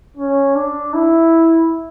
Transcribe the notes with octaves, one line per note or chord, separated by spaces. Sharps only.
C#4
D4
E4